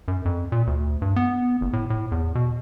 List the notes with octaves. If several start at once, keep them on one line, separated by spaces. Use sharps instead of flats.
F#2
F2
A#2
D2
G2
B3
F#1
A2
A2
E2
B2